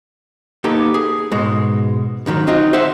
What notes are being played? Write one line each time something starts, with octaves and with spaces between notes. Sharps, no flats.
A#3 B3 D#4 G4 A4
G#4
G#2 B2 G#3
D2 D3 D#3 F#3
C4 D#4 F4 F#4
C5 E5 F#5